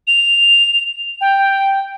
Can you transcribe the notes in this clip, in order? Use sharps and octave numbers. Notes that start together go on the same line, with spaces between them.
F7
G5